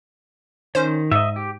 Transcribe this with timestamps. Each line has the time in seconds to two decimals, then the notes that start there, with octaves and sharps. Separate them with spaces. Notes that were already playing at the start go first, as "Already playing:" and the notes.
0.75 D#3 C#4 C5
1.12 G#2 D#5 E5
1.36 G4